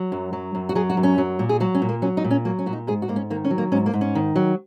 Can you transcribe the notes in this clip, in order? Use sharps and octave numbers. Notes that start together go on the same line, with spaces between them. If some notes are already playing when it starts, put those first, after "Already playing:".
Already playing: F#3
F#2
F#3
F#2
F#4
F#3 G#4
F#4
F#2
C#4
F#3
A#2
G#4
F#3 F#4
C#4
A#2
A#3
F#3 C#4
D#4
A#2
C#4
F#3 A#3
C#4
A#2 F#4
D#4
G#2 G#4
F#4
G#2 A#3
C#4
D#3 A#3
C#4
F#3
A#3
G#2 C#4
A#3
G#2
C#4
D#3
F#3